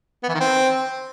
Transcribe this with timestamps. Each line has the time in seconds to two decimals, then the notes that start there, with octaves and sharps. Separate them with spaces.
0.23 B3
0.29 E3
0.34 D#3
0.40 C4